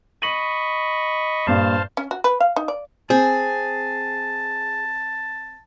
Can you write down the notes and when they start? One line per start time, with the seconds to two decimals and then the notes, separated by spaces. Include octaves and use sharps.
0.22 D#5 B5 C#6 D#7 F#7
1.47 G2 A#2 C5 F5 A5
1.97 C#4
2.11 F#4
2.24 B4
2.40 F5
2.56 D#4
2.68 D5
3.10 C4 G#4 A5